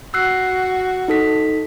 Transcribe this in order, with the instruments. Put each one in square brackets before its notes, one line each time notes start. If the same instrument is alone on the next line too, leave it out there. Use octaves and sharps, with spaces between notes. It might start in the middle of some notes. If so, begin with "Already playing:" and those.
[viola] F#4 [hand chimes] E6 F#6 C7
[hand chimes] D#4 A4 B6